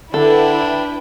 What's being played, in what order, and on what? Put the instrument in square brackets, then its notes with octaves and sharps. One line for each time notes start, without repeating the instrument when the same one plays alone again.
[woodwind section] D3 [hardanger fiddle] D4 [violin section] E4 B4 G5 [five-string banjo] A4